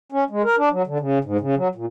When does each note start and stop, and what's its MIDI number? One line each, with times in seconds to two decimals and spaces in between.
0.12 0.24 61
0.30 0.42 56
0.44 0.56 70
0.57 0.69 62
0.71 0.82 54
0.87 0.98 50
1.00 1.18 49
1.25 1.37 44
1.41 1.55 49
1.57 1.68 54
1.75 1.86 46